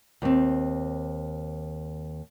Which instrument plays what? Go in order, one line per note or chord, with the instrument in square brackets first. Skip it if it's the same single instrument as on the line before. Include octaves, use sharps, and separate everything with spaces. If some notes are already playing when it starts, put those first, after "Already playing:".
[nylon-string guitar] D#2 C4